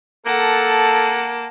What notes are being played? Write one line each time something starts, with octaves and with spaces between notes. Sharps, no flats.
A#3 A4 F#5 A5